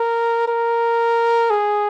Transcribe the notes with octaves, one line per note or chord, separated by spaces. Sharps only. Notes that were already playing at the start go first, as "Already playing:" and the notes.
Already playing: A#4
A#4
G#4